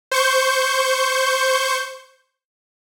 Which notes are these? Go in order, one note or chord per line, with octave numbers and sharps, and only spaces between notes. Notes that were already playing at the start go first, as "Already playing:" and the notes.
C5 C#6 G6